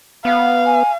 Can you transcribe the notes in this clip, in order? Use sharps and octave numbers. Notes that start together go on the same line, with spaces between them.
B3 F5
G#5